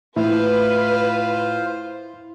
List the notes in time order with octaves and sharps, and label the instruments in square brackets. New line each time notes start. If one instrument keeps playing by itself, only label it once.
[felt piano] A2 [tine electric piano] E4 [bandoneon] F4 C5 F5 [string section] B4